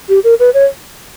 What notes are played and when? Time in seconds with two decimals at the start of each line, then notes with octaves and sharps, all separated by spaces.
0.09 G4
0.24 A#4
0.40 B4
0.54 C#5